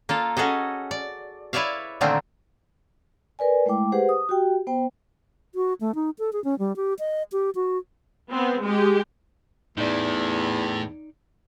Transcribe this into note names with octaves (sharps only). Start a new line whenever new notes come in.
A#3 F4 A4
C#4 F#4 G#4 A4 D#5
D5
E4 B4 C#5 D5 E5 F5
A#2 D3 D#3 A3 A#3 C4
A#4 B4 D5 G#5
G#3 A3 E4 G5 D6
G4 G#4 B4 C5 F#5
D#6
F#4 G4 G5
B3 C5 G5
F#4
A3
D#4
A4
G#4
C#4
G3
G4
D#5
G4
F#4
B3 C4
G#3 G4
E2 A2 D#4 D5